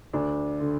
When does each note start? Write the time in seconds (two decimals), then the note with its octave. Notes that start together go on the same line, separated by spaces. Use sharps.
0.13 D2 D4
0.60 D3